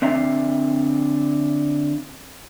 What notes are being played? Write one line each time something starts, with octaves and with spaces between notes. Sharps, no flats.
D3 C4 E5 F5 A#5